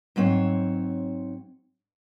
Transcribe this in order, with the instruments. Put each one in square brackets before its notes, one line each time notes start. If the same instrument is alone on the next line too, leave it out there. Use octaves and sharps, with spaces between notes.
[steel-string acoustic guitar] G#2 F#3 C4 C#5